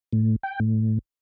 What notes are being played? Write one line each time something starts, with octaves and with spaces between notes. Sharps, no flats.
A2
G5
A2